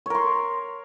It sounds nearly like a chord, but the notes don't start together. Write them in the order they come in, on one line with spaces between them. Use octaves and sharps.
C#5 A#4 C6